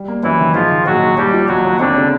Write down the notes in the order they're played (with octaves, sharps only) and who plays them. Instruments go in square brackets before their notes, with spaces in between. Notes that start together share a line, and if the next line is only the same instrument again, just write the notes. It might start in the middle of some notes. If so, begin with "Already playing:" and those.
Already playing: [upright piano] G3
A#3
[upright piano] F#2 [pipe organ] E3 E4
[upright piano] D#3
[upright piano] G#2 [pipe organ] F3 F4
[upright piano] D#3
[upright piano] A#1 [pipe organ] F#3 F#4
[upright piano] D#3
[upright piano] D#2 [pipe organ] G3 G4
[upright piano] F3
[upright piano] D#2 [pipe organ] F#3 F#4
[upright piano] D#2
[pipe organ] D3 D4 [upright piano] C4
[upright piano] C#3